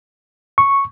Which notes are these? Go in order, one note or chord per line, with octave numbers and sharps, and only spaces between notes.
C#6